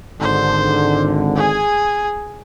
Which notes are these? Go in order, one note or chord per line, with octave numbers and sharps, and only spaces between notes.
G#1 G#2 D3 C5
G#4 G#5